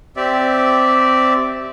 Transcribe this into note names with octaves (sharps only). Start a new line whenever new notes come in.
C4 G4 D5 E5